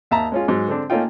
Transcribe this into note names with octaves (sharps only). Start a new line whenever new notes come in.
D#2 E5 A5 A#5
G#3 C#4 F4
G#2 F#3
D3 C4 D4
A3 A#3 C#4 D#4 F4 G5